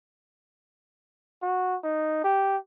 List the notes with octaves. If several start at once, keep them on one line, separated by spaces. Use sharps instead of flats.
F#4
D#4
G4